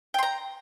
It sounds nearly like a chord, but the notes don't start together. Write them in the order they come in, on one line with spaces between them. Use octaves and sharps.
G5 C6 A#5